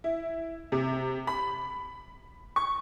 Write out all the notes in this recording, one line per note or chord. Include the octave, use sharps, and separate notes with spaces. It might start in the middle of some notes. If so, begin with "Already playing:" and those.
E4
C3
B5
C#6